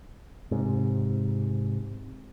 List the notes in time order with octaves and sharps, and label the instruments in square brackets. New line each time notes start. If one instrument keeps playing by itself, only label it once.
[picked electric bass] G#2 C3